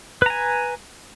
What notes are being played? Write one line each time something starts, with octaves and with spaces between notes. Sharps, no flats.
B4 G#5 A#5